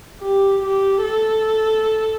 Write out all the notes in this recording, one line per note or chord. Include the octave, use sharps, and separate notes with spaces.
G4
G4
A4